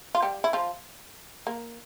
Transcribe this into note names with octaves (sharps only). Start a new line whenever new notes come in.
F4
G3 G4
E4
F3 F4
A#3